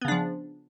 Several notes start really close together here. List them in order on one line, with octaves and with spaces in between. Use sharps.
B3 C#3 D4 F3